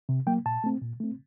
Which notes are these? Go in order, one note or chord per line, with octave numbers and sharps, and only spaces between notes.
C3
F#3 A#3 G5
A#2 A5
A3 C4
A#2
A3 C4